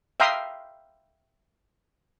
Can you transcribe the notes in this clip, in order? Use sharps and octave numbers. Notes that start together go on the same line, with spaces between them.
E5 F5 G5 A#5 C6 D#6